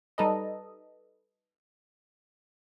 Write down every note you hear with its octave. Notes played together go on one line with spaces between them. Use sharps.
G3 D#4 A4 B4 D#5